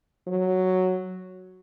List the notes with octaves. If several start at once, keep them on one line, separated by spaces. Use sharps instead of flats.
F#3